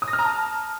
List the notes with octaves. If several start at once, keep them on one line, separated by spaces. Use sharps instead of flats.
D#6
A#6
F6
A#5
A5